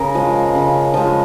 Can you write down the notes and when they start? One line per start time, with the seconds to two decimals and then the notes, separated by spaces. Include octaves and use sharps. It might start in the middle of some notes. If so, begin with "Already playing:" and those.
Already playing: C#3 A#4
0.15 F3 G#3
0.55 C#3
0.94 F3 G#3